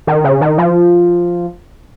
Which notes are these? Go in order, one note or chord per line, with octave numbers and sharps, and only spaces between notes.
D#3
C#3
D#3
F3